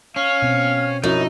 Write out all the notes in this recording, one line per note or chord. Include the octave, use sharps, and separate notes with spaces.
C#4 F5
B2 C4
F#2 F3 C#4 D#4 E4